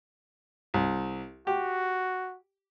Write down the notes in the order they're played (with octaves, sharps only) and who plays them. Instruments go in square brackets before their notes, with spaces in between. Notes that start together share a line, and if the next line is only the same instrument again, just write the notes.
[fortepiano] C2
[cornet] F#4 [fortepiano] G4